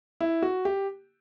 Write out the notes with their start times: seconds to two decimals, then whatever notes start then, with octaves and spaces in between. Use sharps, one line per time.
0.21 E4
0.42 F#4
0.65 G4